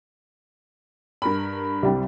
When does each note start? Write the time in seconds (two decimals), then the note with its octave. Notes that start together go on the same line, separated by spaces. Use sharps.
1.22 G2 A#4 B5
1.83 C2 G3 C4